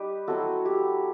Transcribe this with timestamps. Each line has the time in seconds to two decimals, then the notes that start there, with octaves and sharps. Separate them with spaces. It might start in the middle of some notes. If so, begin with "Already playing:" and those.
Already playing: G3 D#4 G4 B4
0.27 F#3 C4 E4 F#4 A4
0.65 G4